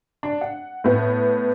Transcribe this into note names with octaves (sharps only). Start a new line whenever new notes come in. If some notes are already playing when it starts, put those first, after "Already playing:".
D4
F#5
A2 B3